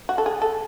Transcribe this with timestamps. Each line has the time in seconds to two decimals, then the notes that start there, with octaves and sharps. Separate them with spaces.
0.09 F#4
0.18 A4
0.26 G#4
0.42 A4